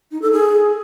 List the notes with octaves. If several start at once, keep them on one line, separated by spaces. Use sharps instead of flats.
D#4
A4
G#4